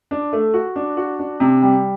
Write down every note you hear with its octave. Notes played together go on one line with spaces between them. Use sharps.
D4
A3
F#4
D4
F#4
D4
C3
G3